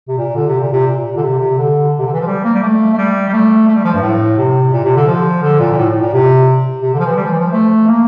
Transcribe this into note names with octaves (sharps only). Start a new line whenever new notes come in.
C3
A#2
D3
C3
A#2
C3
A#2
D3
C3
C3
D3
C3
D3
E3
F3
G3
A#3
G3
A3
A3
G3
G3
A3
A3
G3
F3
G2
A2
C3
A#2
C3
D3
F3
D3
A#2
A#2
A2
A2
A#2
C3
C3
D3
F3
E3
G3
F3
E3
F3
A3
A#3